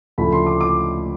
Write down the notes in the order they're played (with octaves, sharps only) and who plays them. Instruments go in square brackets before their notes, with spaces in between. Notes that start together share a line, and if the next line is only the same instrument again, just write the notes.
[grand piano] D2 C#3 F3 A3 B5
C6
D6
D6